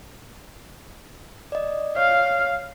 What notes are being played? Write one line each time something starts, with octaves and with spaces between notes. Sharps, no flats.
D5 D#5
C#5 F5